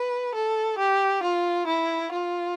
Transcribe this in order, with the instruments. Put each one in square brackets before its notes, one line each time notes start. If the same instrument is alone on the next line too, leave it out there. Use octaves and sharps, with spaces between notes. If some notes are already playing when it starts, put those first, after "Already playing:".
Already playing: [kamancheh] B4
A4
G4
F4
E4
F4